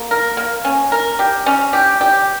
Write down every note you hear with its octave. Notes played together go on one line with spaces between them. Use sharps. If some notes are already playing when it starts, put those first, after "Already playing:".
Already playing: A#3
A#4
A#3
C#4
A#4
G4
C#4
G4
G4